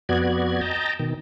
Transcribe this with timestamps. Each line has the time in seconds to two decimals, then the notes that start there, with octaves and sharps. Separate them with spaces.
0.09 F2 B3 F#4 D5 G#6
0.61 D#5 G5 A5 A#5
1.00 B2 D#3